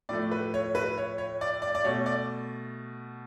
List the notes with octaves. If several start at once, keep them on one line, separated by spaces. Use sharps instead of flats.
A2 F3 A3 D5
B4
C#5
B4
C#5
C#5
D5
D5
D5
B2 A3 C#5
D5